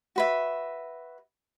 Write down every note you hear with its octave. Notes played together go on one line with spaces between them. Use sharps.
F#4 B4 E5